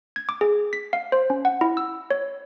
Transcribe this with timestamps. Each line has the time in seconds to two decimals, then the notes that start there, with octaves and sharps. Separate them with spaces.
0.16 G#6
0.29 D6
0.41 G#4
0.73 B6
0.93 F5
1.12 C5
1.30 C#4
1.45 F#5
1.61 E4
1.77 E6
2.11 C#5